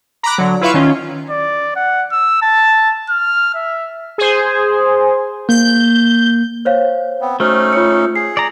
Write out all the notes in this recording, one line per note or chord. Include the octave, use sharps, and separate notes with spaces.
A#5 B5 D6 F#6
D3 F#3
E4 F4 B4 E5 F5 C#6
D#3 C#4 F4
D5
F#5
E6
A5
F6
E5
G#4 C5
A#3 G6
C5 C#5 F5
B3 C4
A3 C#4 D#4 F#4 C5 F6
F4 C#5 C#7
G#4 C7
D5 A#5